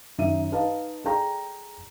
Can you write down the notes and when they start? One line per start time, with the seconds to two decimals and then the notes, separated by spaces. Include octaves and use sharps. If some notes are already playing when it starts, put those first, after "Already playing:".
0.18 F#2 D#3 D#4 E5 D#7
0.52 D#4 B4 D#5 F5 A5
1.05 G#4 A4 D5 G5 A#5